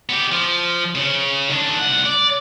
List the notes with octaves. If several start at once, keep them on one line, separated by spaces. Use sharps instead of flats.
B3 G4
F3
C#3
D#3 D4
C2 F#5
D5